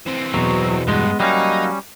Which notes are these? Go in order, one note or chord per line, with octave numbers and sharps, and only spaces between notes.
E3 C4
E2 B2 F#3
G2 G#3 B3
F#3 G3 A#3 C#4 D#4